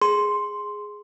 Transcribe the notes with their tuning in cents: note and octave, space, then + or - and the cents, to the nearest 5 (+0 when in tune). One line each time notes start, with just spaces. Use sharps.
G#4 +0 C6 +0